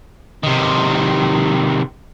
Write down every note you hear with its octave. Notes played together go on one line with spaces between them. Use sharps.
C3 D#3